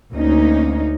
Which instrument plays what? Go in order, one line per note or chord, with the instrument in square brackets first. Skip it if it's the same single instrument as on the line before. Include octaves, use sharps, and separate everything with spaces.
[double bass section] D2 [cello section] A#3 C#4 D#4